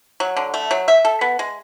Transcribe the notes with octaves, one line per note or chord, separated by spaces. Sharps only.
F#3
D3
A3
F#3
E5
A4
B3
G#3